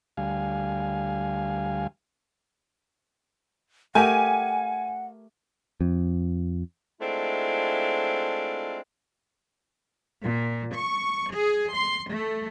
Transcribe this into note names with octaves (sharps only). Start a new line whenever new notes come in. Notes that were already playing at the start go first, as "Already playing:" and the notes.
D2 G3 F5 G#5
A3 G4 A#4 F#5 G#5
F2
G#3 A3 C4 D4 E4 F4
A#2
C#6
G#4
C6
A3